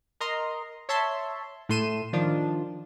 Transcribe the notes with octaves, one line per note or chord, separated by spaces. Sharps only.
A#4 D#5 A#5 C6
C#5 E5 A5 C6
A2 A3 C6 D#7 E7
D#3 F3 D4 F4